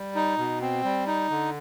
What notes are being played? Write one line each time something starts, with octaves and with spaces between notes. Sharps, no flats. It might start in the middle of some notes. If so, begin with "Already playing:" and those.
Already playing: G3
D#4
B2
C4
G3
D#4
D3